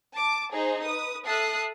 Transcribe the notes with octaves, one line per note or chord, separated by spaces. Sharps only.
A5 D6
D#4 G#4 C5
B4 D#6
A4 E5 D#6 F#6 C7